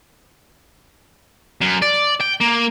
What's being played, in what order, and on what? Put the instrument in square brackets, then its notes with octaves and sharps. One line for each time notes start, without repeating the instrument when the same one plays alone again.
[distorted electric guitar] F#2
D5
G5
A#3